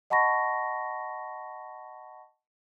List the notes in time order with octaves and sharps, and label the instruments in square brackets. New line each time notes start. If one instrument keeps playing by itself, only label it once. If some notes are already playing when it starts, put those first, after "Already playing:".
[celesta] D#5 F#5 A5 B5 C#6 A#6